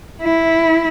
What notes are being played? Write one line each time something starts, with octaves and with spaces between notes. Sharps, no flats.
E4